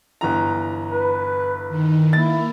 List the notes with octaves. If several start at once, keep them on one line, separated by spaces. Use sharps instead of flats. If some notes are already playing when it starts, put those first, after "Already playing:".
G1 E3 A#5
B4
D#3
A#3 E4 A6